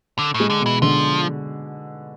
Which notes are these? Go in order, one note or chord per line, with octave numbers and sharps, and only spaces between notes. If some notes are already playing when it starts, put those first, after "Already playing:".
D3
A2
G#3
D3
B2
E3
D3 F3